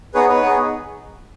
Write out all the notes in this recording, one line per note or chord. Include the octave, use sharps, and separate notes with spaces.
B3 D#4 G#4 B4 C#5
B4 C#5
B3 D#4 G#4